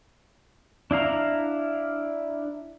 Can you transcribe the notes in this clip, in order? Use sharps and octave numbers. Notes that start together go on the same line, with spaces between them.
D4 E4 F5 A#5